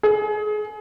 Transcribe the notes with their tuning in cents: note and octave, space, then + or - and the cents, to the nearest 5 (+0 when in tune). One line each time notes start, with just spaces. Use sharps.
G#4 +30